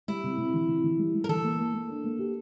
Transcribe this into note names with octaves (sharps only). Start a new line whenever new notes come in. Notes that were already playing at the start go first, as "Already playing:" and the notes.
G3 E4
C3
C3
E3
C3
E3
G3
G3
A#4
E3 A4
A#3
A#3
A#3
D4
A#3
G4